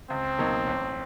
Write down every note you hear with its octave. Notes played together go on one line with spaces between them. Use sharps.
C#2 C4
B2 F#3 A#3 D#4
A1